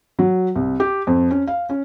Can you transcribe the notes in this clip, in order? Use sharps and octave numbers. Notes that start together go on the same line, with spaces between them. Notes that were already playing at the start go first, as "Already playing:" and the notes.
F#3
C2
G4
F2
C#4
F5
C#4